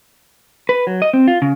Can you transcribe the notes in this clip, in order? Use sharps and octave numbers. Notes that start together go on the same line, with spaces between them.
B4
F#3
D#5
C4
F4
C#3